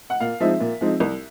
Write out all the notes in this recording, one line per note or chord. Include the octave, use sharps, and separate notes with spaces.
F#5
A#2 F5
F3 G#3 C4 D#4 E5
A#2
F3 G#3 C4 D#4
C2